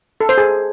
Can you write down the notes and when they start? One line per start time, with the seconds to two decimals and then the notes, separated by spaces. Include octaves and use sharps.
0.21 A4
0.29 C5
0.38 G#4